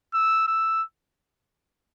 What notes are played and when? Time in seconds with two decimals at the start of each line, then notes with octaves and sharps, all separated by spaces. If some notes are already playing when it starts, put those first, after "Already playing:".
0.14 E6
0.47 E6